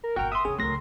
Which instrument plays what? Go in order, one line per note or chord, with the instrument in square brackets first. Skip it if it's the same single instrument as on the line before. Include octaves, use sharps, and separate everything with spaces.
[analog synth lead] A#4
[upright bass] G1 A#2 [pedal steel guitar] F#4 A#4 [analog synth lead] G5
[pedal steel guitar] E5 C6 [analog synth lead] D#6
[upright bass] E2 C3 [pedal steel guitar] C#4 [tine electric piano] G#4
[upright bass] D1 C#2 [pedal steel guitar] F#3 A#4 [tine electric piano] A3 A#6 [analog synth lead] C6